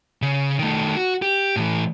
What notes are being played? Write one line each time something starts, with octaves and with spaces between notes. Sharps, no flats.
C#3
D#3 A3
F#4
G4
A2 E3